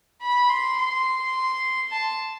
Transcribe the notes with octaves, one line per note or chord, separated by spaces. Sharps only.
B5
C6
C6
A5